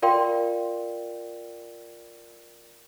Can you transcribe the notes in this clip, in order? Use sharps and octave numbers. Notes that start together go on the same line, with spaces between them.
F4 A#4 D5 F5 G5 C6